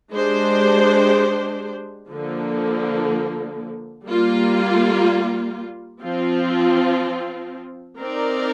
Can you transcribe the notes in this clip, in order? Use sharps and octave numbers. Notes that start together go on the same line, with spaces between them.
G#3 D4 G4 C5
D3 F3 A#3
G3 A#3 F4
F3 C4 F4
C4 D#4 A#4 D5